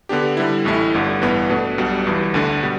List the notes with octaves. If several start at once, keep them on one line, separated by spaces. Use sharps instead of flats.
D3 B3 D4 G4
D3 G3 E4
A1 A2 A3 E4
G1 G2 D3
A1 G2 E3 B3
B2 A3 D4 B4
B1 B2 G3 D4
G1 G2 E3
D2 D3 A3 D4
B2 G3